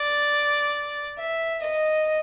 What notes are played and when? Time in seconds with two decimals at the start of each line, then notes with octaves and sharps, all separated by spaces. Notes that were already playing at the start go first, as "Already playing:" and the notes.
Already playing: D5
1.18 E5
1.62 D#5